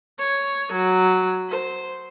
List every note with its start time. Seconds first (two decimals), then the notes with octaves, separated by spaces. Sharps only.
0.19 C#5
0.73 F#3
1.49 C5